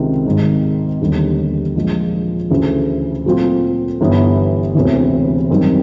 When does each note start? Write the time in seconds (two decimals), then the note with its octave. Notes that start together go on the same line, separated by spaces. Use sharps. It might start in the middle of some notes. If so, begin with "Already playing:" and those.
Already playing: C#2 C3 D#3
0.26 G#1 G#2 D#3
1.01 E1 D#2 D3 G3
1.76 A#1 A#2 F3 G#3
2.50 D2 C#3 E3 A3
3.26 A#2 F#3 A3 C4 F4
4.00 G1 G2 E3 G3 B3
4.75 E1 D2 C3 E3
5.50 G#1 F#2 D#3 G3 C4